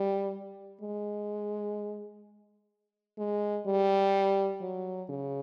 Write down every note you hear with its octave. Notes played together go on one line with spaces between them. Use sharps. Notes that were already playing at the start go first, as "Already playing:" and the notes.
Already playing: G3
G#3
G#3
G3
F#3
C#3